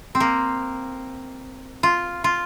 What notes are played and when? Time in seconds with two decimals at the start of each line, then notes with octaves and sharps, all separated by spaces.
0.15 C4
0.20 A#3
1.83 F4
2.24 F4